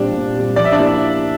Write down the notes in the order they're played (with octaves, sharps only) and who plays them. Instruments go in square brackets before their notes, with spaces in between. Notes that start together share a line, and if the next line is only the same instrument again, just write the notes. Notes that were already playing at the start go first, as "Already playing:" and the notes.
Already playing: [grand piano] A#2 G3 C4 G4 [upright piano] D4
[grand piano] A#2
G3 C4 G4
[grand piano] F3 [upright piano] D5
[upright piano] E5
D4 D5
[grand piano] A#3 E4 G4